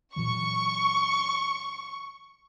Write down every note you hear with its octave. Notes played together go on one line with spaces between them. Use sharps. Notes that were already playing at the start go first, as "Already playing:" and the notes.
A#2 E3 F#3 C#6